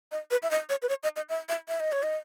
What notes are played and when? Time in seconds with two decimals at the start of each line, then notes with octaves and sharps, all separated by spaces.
0.12 D#5
0.31 B4
0.43 E5
0.51 D#5
0.70 C#5
0.82 B4
0.89 C#5
1.03 D#5
1.16 D#5
1.29 E5
1.49 E5
1.68 E5
1.80 D#5
1.92 C#5
2.03 D#5